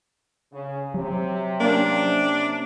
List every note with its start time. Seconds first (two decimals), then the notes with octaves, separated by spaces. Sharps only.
0.52 C#3
0.94 C3 F#3 G4
1.60 A#3 C#4 D4